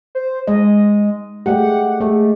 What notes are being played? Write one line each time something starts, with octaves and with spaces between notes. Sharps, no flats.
C5
G#3 D#5
G#3 A3 G4 F#5
G#3 A3